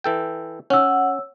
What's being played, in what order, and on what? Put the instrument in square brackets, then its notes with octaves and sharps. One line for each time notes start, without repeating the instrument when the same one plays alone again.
[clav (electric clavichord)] E3 A4 G5
[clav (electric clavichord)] C#4 [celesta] C#5 E6 [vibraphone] F#5